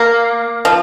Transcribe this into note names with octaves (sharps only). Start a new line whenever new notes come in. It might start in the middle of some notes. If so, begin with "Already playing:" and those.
Already playing: A#3
F3